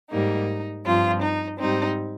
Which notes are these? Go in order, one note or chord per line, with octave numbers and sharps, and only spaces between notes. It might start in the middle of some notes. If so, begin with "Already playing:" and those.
G#2 G3 A#3 D#4
G2 F3 C4 F4
D#4
G#2 G3 C4 D#4